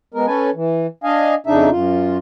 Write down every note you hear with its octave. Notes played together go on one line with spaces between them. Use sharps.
G#3 B3 A#4
C#4 A4 B4 G#5
E3
D4 D#5 F5 G#5
F2 C#3 D4 D#4 E5
F#2 F4